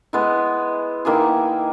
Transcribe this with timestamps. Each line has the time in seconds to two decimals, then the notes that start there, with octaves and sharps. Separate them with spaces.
0.13 G#3 B3 E4
1.05 D#3 A#3 E4 G#4